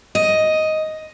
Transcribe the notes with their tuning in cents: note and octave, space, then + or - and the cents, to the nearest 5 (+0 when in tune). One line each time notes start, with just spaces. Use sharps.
D#5 +5